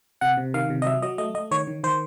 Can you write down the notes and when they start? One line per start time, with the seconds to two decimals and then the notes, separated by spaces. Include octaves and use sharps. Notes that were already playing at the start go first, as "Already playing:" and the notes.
0.21 C3 F#5
0.37 C3
0.54 D#3 F5
0.70 C3
0.82 D#5
0.86 F#3 E5
1.02 F#3 D#5
1.18 A3 D#5
1.34 A3 D#5
1.51 D#3 C#5
1.67 D#3
1.84 D#3 C5